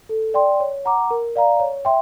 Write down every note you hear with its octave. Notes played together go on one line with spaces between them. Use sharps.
A4
D5 G5 C6
C#5
F#5 A#5 D6
A#4
D5 F5 A#5
C#5
E5 G5 C6